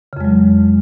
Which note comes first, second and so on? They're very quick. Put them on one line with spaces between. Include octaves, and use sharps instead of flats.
C#3 F2 G#3 F#3